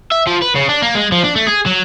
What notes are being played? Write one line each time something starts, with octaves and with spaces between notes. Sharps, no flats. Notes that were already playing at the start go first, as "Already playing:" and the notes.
E5
F3
B4
C#3
D4
A#3
G#3
F3
D4
A3
G#4
F#3